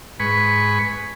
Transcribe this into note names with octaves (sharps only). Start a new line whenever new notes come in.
G#2 B4 G#5 B5 C#6